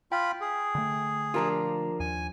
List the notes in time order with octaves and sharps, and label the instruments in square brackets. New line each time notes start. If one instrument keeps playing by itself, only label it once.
[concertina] F4 B5 [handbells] G5
[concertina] G#4
[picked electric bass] D3 A3
[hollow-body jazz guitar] F3 D4 F4 [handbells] G4 A#4 A#5
[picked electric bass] D#2 [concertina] G#5